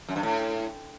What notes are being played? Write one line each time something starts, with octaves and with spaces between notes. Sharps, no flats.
F#2
G2
A2